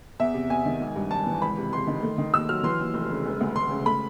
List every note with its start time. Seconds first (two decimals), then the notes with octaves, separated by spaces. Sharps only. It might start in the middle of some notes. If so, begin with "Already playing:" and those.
0.19 E2 E5
0.34 C3
0.50 E2 G#5
0.65 D#3
0.81 G#1
0.96 G2
1.11 G#1 A5
1.27 E3
1.42 C#2 B5
1.58 C3
1.73 C#2 C6
1.87 D#3
2.03 A3
2.18 D#3
2.34 D#2 E6
2.49 F#3 F6
2.63 E3 C6
2.80 D#2
2.94 F1
3.10 C#3
3.25 E1
3.41 D2
3.56 E1 C6
3.71 C#3
3.86 A3 B5